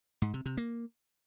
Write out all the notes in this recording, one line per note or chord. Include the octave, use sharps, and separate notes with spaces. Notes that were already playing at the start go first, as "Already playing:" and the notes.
G#2
C3
C3
A#3